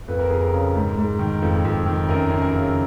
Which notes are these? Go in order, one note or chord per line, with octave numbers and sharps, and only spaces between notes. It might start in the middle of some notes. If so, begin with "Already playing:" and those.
F2 B4
A#4
F2 G#4
A#4
C#3
G#2
G#2
D#3
F2
F2
D#3
F#2 A#4
F#2
A#4
C#3